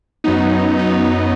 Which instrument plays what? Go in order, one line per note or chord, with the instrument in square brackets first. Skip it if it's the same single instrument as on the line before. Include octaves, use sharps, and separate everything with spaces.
[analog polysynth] F#2 F#3 B3 D#4
D#4